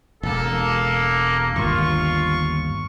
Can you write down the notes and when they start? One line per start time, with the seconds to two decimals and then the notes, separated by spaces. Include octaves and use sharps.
0.23 E1 A#3 A4
1.56 G1 D#2 F4 C#6